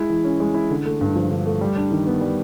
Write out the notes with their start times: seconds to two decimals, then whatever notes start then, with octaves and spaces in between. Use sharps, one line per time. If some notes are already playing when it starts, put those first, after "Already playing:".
Already playing: G#3 E4
0.10 E3
0.24 C#4
0.40 G#3
0.54 E4
0.70 D3
0.85 A3
1.01 G2
1.16 F3
1.30 D3
1.46 A3
1.61 G3
1.76 D4
1.91 D#3
2.07 B3
2.21 G3